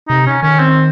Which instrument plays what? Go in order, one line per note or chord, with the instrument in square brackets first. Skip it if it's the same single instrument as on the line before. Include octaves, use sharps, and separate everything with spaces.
[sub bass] C3 [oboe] D#4
[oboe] C#4
[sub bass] D#3 [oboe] C#4
[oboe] C4